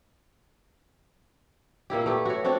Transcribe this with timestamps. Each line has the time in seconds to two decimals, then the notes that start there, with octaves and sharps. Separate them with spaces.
1.90 A#2 A#3 E4 G4
2.06 A3 B3 E4 G4
2.25 F#4 C#5
2.44 C4 D4 F#4 C#5